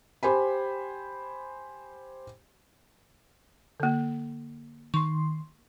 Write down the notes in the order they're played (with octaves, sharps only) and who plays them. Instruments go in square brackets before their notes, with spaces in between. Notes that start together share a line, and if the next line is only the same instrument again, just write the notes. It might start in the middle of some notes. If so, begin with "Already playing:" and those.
[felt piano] G4 C5 G#5 B5
[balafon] D3 A#3
[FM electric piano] D#3 C6 [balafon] C#6